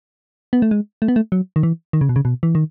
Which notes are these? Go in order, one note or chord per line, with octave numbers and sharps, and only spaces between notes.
B3
A3
G#3
A3
B3
A3
F#3
D#3
E3
D#3
C#3
B2
C#3
B2
E3
D#3